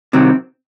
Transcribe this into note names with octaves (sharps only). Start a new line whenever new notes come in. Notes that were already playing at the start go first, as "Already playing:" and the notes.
C2 C3 D#3 F#3 C4